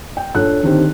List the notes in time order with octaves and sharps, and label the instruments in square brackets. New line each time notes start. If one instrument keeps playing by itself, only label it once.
[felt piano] G5
A#2 D4 A4 C#5 F#6
D3 D#3 C4 G4